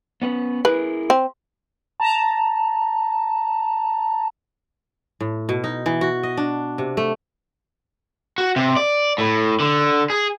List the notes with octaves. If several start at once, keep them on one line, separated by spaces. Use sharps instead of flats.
B3 C#4 B4
E4 G#4 A#4 B4
C4
A5 A#5
A2
B2
D#4
E3
F#4
D#5
D4
C3
A3
F#4
C3
D5
A2
D3
G#4